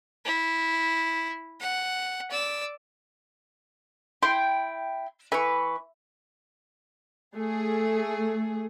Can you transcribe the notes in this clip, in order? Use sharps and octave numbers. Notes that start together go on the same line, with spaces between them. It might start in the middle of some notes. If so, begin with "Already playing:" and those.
E4
F#5
D5 E6
E4 G5 C6
E3 B4 C#6
A3 G#4